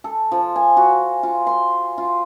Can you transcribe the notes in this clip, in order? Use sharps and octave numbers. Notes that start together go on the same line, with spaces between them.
A4
F3
G#5
F#4
F4
C6
F4